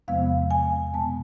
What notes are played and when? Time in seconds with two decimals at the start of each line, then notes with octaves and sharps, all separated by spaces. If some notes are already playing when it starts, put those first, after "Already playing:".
0.08 E2 C3 F3 G#3 B3 F5
0.51 G#5
0.94 B2 G#3 B3 A5